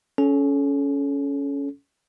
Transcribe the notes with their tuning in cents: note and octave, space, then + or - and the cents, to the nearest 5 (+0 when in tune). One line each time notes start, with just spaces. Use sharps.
C#4 +15 A4 -30